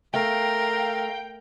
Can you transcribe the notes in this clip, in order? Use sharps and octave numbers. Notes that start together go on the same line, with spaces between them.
A3 A#4 F5 G5